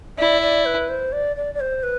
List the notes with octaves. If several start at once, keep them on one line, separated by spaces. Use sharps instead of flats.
E4 D5
D5
B4
C5
D5
D5
D5
C5
B4